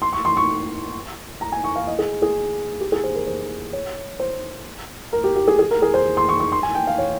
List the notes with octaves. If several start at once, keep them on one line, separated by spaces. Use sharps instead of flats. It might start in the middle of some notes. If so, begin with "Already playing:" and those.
C6
C#6
C6
C#6
A#5
G#5
C#6
F5
D#5
G#4
G#4
G4
G#4
C5
A#4
C5
C#5
C5
A#4
G4
G4
G#4
G#4
A#4
G#4
C5
C6
C#6
C#6
C6
G#5
G5
F5
C#5